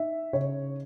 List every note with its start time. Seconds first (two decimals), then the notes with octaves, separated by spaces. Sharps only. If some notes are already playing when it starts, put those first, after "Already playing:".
Already playing: D#4 E5
0.33 C#3 C#5